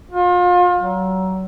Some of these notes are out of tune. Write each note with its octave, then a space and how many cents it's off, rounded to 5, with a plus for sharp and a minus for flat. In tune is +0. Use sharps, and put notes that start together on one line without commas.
F4 +35
F#3 +30